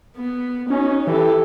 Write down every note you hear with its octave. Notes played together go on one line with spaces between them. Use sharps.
B3
C#4 D#4 F#4
E3 G4 A4